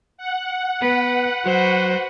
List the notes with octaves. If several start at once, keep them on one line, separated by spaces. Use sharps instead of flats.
F#5
B3 B4
F#3 F#4 B4 C5